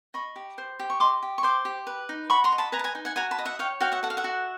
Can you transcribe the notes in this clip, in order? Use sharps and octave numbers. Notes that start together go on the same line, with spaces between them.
D#5 B5 C#6
G4
C5
G4
C#6
D#5 C6 D6
G4
C#6
C5 C6 D6
G4
B4
D#4
F#4 B5 C#6
A#5 C6
D#5
A5 B5
B4 G#5 A#5
A5
G#5 A#5
D#4
F#5 G#5
F#4 G#5 A#5
A5 B5
D#5
E5 F#5
C#5 F5 G5
F#4 F5 G5
E5 F#5
A4 F#5
F5
E5 F#5
F#4